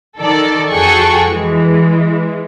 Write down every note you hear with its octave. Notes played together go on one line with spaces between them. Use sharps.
D#3 A4 D5
F2 F#4 G#4 A4 G5 C#6
E3 G#3